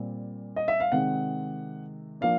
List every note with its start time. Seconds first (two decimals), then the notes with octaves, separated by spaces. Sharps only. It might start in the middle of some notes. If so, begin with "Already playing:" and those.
Already playing: A#2 G3 C4
0.56 D#5
0.68 E5
0.80 F5
0.92 C3 D#3 G#3 C4 F#5
2.21 F3 A#3 D4 F5